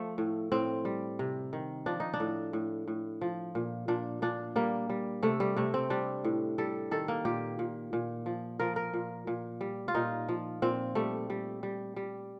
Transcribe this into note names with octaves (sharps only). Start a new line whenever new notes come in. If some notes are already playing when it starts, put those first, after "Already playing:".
Already playing: F3 A3
A2
A2 C4
G3
C3
D#3
F3 D4
D#4
D4
A2
A2
A2
F3
A#2
A#2 D4
A#2 D4
G3 A#3
G3
C3 A3
G3
C3 A3
C4
G3 D4
A2
G3 A4
D#3 A4
A#3
A#2 G4
A#2
A#2
F3
F3 A#4
A#4
A#2
A#2
G3
F4
A#2 D#4
F3
A#2 C4
G3 A3
G3
G3
G3